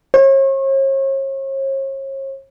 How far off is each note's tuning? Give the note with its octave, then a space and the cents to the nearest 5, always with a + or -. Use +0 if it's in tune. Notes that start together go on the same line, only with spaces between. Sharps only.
C#5 -40